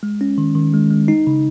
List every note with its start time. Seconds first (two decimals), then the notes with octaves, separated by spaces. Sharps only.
0.03 G#3
0.21 C#4
0.38 D#3
0.55 D#3
0.74 G#3
0.90 G#3
1.08 D#4
1.27 C#3